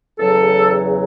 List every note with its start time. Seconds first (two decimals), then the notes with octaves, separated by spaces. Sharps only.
0.19 E2 C#3 F#3 A4